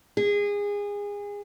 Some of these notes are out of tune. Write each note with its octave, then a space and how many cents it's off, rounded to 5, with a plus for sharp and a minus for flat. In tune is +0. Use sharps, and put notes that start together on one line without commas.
G#4 -25